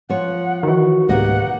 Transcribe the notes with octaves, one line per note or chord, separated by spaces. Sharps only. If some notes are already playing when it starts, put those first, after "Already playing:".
F3 F4 C#5 F#5
D#3 E3 F#4
C#2 G#2 B2 A#3 G4 D#5 F#5